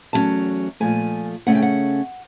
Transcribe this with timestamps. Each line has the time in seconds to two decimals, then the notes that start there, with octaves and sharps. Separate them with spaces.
0.13 E2 C#3 F#3 A3 C#4 A5
0.80 A#2 F3 A3 G#5
1.47 C#3 F3 A3 C#4 F#5
1.55 G5
1.62 F#5